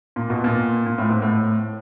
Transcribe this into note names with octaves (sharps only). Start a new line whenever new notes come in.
A#2
B2
A#2
A#2
A2
G#2
A2